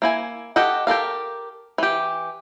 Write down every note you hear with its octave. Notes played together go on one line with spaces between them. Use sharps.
A#3 E4 G#5
G4 A4 D#5 F#5
G4 A4 A#4 F5
E3 G4